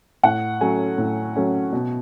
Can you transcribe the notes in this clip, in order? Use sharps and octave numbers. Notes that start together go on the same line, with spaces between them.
A2 F#5
F#3 A3 C#4 G#5
A2
F#3 A3 C#4
B2